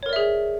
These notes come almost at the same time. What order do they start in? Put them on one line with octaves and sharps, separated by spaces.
C#5 A#4 D5 E5 G#4